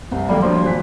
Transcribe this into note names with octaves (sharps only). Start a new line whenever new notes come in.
C2 C4
D#2 F#3 G3 A3 A#3 D5
F3 G3 D4 C6
G#1 A#2 F#6 B6